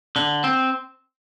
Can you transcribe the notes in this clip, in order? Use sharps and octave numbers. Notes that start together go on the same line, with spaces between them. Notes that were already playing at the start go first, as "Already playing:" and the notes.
D3
C4